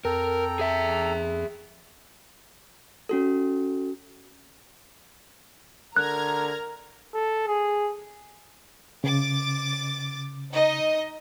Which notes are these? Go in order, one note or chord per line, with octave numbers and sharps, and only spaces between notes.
F2 A4 A#4 G5 A#5
G#4 E5
C#4 F#4 A4
D3 A#4 A#5 F6 F#6 G#6
A4
G#4
C#3 D6 A6
D#4 D#5